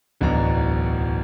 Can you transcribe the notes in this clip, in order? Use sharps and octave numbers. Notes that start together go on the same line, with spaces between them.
D1 B1 E2 B2 D4 A#5